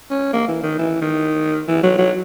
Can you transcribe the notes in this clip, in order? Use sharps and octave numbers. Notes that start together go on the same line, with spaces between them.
C#4
A#3
E3
D#3
E3
D#3
E3
F#3
F#3